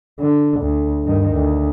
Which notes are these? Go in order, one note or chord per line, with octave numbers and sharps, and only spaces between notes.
D3
D2
G2 D#3
D2